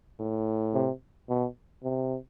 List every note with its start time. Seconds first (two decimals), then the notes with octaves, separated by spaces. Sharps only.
0.19 A2
0.74 C3
1.29 B2
1.84 C3